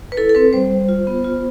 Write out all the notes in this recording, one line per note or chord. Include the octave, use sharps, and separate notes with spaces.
B4
E4 A4
A4
C4 B4
G3 C5
G3
F4
B3
F4